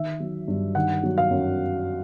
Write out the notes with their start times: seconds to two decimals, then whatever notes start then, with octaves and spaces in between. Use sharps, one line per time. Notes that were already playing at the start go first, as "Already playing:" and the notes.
Already playing: D#3 E5
0.20 F#3
0.48 G2
0.75 D#3 F#5
1.03 F#3
1.18 F5
1.31 F#2